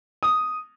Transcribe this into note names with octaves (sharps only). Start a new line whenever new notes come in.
D#6